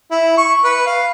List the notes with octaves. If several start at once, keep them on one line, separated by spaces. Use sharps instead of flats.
E4
C#6
B4
F5